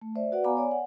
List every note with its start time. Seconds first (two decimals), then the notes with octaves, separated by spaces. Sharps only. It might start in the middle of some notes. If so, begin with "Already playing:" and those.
0.01 A3
0.16 C5 D5 E5
0.32 F#4 B4 D5 F#5
0.44 B3 F5 G#5 A#5 B5 D6
0.57 C#5 D5 G#5
0.71 F#5